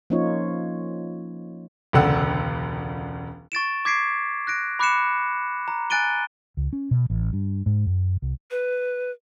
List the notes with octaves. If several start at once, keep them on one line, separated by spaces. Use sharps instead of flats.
F3 A#3 C#4 D#4 F4 C#5
E1 C#2 D3 F#5 E6
C#6 A6 D7 E7
D6 G#6 B6 C7 D7
F#6 A#6 D7
B5 D6 F#6 C7 C#7 E7
A#5
G#5 F#6 A6 D7 D#7 G7
C#2
C#4
B2
A1
G2
G#2
F#2
C2
B4